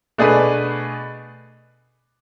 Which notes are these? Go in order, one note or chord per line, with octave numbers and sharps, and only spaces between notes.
B2 A3 D4 G#4 B4